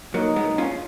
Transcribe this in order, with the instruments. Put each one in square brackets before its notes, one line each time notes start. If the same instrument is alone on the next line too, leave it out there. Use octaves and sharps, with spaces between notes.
[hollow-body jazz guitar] F#3 A#3 [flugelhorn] D#4
[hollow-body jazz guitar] G#3 B3
C#4 F4